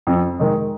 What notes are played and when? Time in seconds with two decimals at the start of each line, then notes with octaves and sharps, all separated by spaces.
0.07 F2
0.39 D#3 G#3